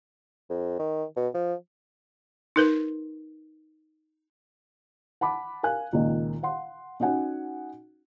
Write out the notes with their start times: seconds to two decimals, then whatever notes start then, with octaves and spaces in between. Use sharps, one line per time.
0.49 F2
0.79 D#3
1.16 B2
1.34 F3
2.56 D#4 A#4 B4
5.21 F#5 A5 B5 D6
5.63 A#4 F5 G#5 F#6
5.93 C#2 A#2 D#3
6.43 F5 F#5 C6
7.00 C#4 D#4 F#4 F#5 G#5